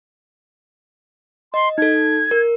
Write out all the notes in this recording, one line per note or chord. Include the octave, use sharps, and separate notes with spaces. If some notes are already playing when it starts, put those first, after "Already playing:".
D#5 C6
D#4 A4 G#6
A#4